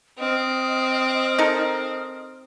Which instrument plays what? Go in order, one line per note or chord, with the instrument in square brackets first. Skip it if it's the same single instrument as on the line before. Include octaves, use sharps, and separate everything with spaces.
[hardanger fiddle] C4 [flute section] D#5 D#6 F6
[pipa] D#4 A4 A#4